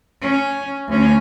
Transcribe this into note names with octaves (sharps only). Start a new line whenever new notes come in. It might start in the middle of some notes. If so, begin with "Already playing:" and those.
C#4
D2 C#4